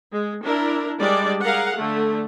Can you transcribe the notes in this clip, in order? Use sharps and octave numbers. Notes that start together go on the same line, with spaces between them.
G#3
D4 E4 A#4
G3 G#3 D4 D5
G#4 A#4 F5 F#5
D3 A3